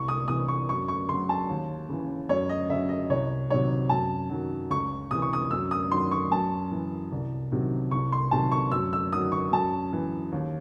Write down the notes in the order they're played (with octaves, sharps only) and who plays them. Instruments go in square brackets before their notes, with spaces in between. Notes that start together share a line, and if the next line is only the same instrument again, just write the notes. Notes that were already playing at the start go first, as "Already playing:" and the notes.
Already playing: [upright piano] C2 C#6
D#6
C3 E3 D#6
C#6
F#2 C#6
C#6
C#3 F#3 C6
A5
D#2
C#3 E3
F#2 C#5
D#5
C#3 F#3 E5
D#5
C2 C#5
C3 D#3 F#3 C#5
F#2 A5
D#3 F#3
C#2 C#6
C3 E3 D#6
C#6
D#6
F#2 E6
D#6
D#3 F#3 C6
C#6
F#2 A5
E3
C2
C3 D#3 F#3
C2 C#6
C6
C3 D#3 F#3 A5
C#6
F#2 E6
E6
D#3 F#3 D#6
C#6
F#2 A5
E3
D#2